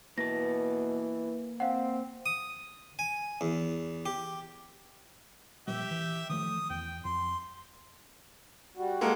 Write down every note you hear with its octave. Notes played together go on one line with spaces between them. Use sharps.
B2 E3 A#3 A5 A#6
C4 F5 F#5
D#6
G#5
E2
G4
A#2 F3 G3 G4 E5
E3
D#3 F3 A3 D#6
E2 G5
F2 C6
G3 F#4
G#3 A#3 A4